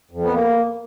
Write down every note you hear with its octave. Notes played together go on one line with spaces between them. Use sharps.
F2
B3
A#3